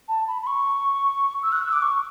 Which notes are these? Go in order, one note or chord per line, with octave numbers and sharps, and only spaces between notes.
A5
B5
B5
C#6
E6
F#6
E6
D6
C#6